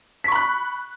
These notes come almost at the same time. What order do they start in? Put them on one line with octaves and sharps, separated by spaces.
B6 C#6 B5 F#6